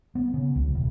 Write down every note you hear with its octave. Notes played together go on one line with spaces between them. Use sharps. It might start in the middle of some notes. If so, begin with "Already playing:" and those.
B3
C#3
C#2
E1